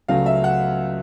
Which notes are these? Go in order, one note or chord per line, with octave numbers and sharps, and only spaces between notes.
C#2 C#3 F#3 A3 F5
E5
F#5